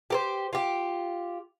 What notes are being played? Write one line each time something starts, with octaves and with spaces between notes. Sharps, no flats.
G4 A#4 C5
F4 G4